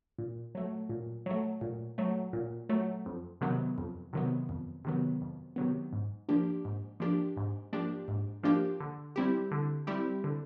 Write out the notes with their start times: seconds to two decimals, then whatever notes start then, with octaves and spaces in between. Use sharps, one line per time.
0.19 A#2
0.55 F#3 A3
0.89 A#2
1.26 F#3 A3
1.61 A#2
1.98 F#3 A3
2.33 A#2
2.69 F#3 A3
3.06 F2
3.41 C3 D#3 F#3 B3
3.78 F2
4.13 C3 D#3 F#3 B3
4.49 F2
4.85 C3 D#3 F#3 B3
5.21 F2
5.56 C3 D#3 F#3 B3
5.93 G#2
6.29 F3 A#3 D4 G4
6.65 G#2
7.00 F3 A#3 D4 G4
7.37 G#2
7.73 F3 A#3 D4 G4
8.08 G#2
8.43 F3 A#3 D4 G4
8.80 D3
9.16 G3 C4 E4 G4
9.52 D3
9.87 G3 C4 E4 G4
10.24 D3